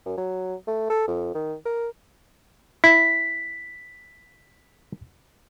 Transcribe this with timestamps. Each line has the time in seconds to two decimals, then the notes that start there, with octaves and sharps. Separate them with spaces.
0.06 F#2
0.18 F#3
0.67 A3
0.90 A4
1.08 F2
1.34 D#3
1.65 A#4
2.84 E4 B6